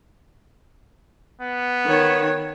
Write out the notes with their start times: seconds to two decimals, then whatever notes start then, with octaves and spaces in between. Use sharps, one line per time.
1.41 B3
1.87 D#3 C#5